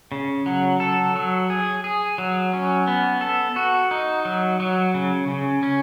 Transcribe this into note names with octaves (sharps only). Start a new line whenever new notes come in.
C#3
F#3
A4
F#3
G#4
G#4
F#3
C#4
B3
A4
F#4
D#4
F#3
F#3
C#3
C#3
C#4